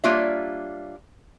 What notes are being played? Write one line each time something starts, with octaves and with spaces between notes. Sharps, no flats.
G3 A#3 D4 F4 C#5 E5